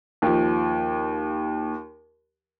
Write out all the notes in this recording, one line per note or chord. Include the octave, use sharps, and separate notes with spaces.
D#2 F3